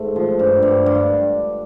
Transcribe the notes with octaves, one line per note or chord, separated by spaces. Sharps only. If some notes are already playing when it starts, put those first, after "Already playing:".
Already playing: G#2 A3
F3
G2
G2
G2